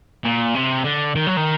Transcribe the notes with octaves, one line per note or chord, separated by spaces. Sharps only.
A#2
C3
D3
D#3
F#3
D#3